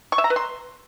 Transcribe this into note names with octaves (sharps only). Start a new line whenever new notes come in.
C#6
E5
A#5
B4
C6